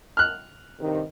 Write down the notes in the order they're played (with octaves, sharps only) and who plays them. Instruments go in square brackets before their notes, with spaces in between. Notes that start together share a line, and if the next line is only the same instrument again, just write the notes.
[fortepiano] F6 F#6
[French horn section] G2 C3 D#3